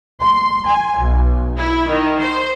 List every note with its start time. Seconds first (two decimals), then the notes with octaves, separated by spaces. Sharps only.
0.21 C6
0.67 G#5
0.99 B1
1.57 E4
1.88 D#3
2.19 C5